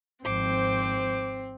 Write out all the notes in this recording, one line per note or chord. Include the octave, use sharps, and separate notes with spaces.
G#1 F3 C4 C5 D6